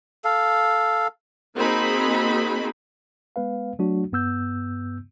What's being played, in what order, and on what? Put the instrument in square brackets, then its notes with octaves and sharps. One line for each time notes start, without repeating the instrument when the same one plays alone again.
[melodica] A4 F5
[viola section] A#3 C4 D#4 F#4 G#4 B5
[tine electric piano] G#3 B3 B4 F5
F#3 A3 D4 F#4
G2 B3 E6 G6